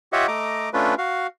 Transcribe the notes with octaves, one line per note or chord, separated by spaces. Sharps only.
F4 G4 C#5 D#5 E5 F#5
A3 D#5 A#5 D6
A3 C#4 D4 F4 B4
F#4 F5